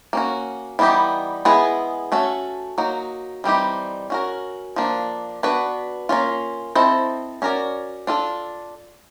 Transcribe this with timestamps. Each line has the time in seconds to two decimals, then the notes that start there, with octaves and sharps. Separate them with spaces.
0.13 A#3 C#4 F#4
0.79 E3 G3 B3 D#4 G4
1.45 G#3 B3 E4 G#4 B4
2.12 A3 C#4 F#4 A4
2.78 F#3 A#3 D#4 F#4
3.44 E3 G3 C4 D#4 G4
4.10 C#4 F#4 A#4
4.76 F3 A#3 D4
5.43 B3 D4 F#4 B4
6.09 A#3 C#4 F4
6.75 C4 E4 A4 C5 D#5
7.42 C#4 F#4 A#4 D5
8.07 D4 F4 A4